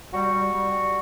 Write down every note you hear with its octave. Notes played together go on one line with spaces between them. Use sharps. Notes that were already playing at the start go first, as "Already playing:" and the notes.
G3 F#4
G3
G3
G3